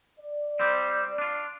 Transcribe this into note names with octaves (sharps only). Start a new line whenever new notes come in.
D5
G3 C4
D4 F4